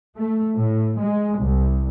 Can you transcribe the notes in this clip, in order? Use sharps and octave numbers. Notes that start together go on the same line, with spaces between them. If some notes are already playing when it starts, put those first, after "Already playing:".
A3
A2
G#3
C2